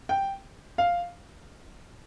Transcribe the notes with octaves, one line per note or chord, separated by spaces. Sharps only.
G5
F5